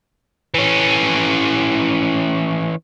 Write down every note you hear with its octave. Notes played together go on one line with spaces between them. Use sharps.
E3 C#4